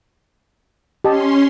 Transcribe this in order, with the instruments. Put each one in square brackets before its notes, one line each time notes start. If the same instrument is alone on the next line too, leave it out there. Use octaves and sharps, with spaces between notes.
[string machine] C#4 C6 [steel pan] G4 D#5 A5